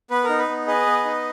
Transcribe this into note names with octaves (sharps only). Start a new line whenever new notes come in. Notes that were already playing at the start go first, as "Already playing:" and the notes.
B3 B4
D#4 A#4
B4
B3
G#4 B4 D#5
B3
D#4